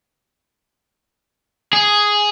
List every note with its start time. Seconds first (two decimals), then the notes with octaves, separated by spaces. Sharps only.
1.73 G#4